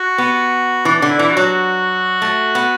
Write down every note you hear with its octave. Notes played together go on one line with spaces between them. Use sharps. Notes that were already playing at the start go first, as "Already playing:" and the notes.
Already playing: F#4
B3
E3 D4
D3
E4
E3
F#4
F#3
A3
B3